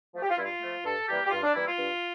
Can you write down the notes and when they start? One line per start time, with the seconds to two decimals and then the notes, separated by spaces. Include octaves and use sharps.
0.15 F3 A3
0.22 G4
0.30 F4
0.37 G2 E4
0.44 F4
0.61 F3 A3
0.84 G2 A4
1.08 E3 G3 A#3 G4
1.24 G4
1.30 G2 F4
1.42 D4
1.54 E3 G3 A#3 E4
1.66 F4
1.78 G2